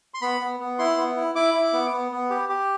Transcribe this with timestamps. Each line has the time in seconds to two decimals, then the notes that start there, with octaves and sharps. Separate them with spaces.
0.14 C6
0.22 B3 B5
0.41 B3
0.60 B3
0.79 E4 C6
0.97 B3
1.16 E4
1.35 E4 D6
1.54 E4
1.73 B3
1.93 B3
2.12 B3
2.30 G4
2.49 G4